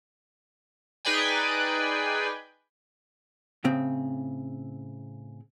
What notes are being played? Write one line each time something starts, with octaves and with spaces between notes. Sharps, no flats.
D#4 G#4 B4 D5 G5 G#5
A2 C#3 C4